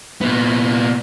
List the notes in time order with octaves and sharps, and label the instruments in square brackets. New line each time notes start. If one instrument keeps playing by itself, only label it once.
[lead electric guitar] A#2 B3